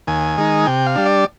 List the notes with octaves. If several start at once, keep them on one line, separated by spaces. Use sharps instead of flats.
D#2 G#5
D#3 G#3 D#4
C3 G5
F5
G3 D4
D5